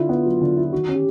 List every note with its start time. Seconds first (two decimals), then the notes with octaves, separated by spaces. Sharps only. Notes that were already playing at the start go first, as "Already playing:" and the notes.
Already playing: D3 E4 F4
0.09 B3
0.26 F#3
0.41 D3
0.57 E4
0.72 D#3 F#4
0.88 C#4
0.95 G4